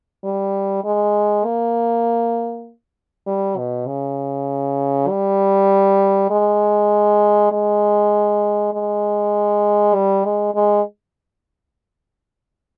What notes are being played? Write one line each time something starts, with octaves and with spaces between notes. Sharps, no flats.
G3
G#3
A#3
G3
B2
C#3
G3
G#3
G#3
G#3
G3
G#3
G#3